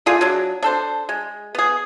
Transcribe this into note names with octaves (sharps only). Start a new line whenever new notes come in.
A3 F4 G#4 D5
F#3 D4
D4 A4 C5
G#3
B3 G#4